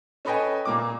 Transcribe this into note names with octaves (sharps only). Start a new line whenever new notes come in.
C#4 A4 B4 D#5 G5 G#5
A#2 A#3 D6